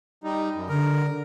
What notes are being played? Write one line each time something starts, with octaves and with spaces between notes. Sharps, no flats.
G3 D#4
F#2
D3 A#4